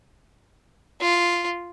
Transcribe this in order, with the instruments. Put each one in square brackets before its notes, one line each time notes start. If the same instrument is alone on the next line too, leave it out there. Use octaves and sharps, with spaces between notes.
[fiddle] F4